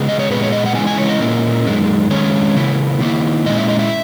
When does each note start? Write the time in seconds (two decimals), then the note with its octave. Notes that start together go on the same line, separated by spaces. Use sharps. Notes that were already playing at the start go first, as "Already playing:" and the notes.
Already playing: C#3 G#3 B3
0.09 D#5
0.19 C#5
0.30 A#2 G#3 B3 B4
0.42 C#5
0.53 D#5
0.66 F#5
0.75 C#3 E3 G#3 G#5
0.87 G#5
0.98 C#5
1.09 D#5
1.21 A#2 A#3 C#4 E4
1.66 F#2 D#3 G#3
2.11 D#3 G#3 C#4 C#5
2.56 C#3 E3 A#3 E4
3.01 D#3 A#3 E4
3.46 A#2 G#3 C#4 E4 D#5
3.57 E5
3.69 D#5
3.79 E5